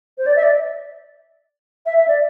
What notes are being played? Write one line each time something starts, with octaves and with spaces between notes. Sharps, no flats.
C5
D5
E5
D5
E5
E5
D5